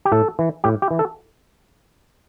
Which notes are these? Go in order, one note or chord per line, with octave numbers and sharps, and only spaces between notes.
G4
A2 A4
E3
A2 G4
G4
E3
A4